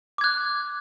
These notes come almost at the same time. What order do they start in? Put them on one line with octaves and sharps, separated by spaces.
D6 G#6 F#6